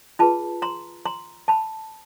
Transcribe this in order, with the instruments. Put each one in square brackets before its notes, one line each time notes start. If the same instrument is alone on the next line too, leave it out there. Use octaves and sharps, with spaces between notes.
[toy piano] F4 G#4 B4 A5 B5
A#5 C6
A#5 C6
A5 B5